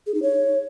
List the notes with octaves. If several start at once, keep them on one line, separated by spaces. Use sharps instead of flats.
G#4
D#4
C#5